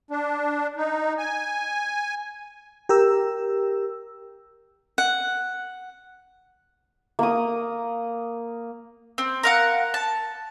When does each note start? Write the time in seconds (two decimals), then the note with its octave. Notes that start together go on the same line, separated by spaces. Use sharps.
0.11 D4
0.77 D#4
1.18 G#5
2.89 G4 A#4 E6
4.98 F#5
7.19 A#3 D#6
9.18 C4
9.43 A#4 F5 F#5
9.94 A5